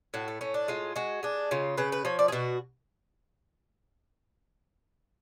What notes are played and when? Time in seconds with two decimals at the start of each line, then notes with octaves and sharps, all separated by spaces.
0.14 A2 F#4
0.28 A3
0.41 A2 C#4
0.54 D4
0.68 G#3 F4
0.96 G#3 F#4
1.23 G#3 D4
1.51 C#3 F4
1.77 C#3 B4
1.92 B4
2.05 F3 C#5
2.19 D5
2.28 G#4
2.32 B2 F#4